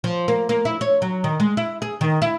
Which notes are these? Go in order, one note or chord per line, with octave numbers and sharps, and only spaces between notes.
F3
A#3
A#3
E4
C#5
F#3
D#3
G#3
E4
G#4
D#3
E4